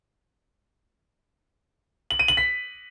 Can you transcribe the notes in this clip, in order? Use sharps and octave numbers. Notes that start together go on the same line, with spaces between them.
F#7
D#7
F#7
B6